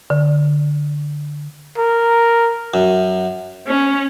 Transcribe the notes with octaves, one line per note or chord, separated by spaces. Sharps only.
D3
A#4
F#2
C#4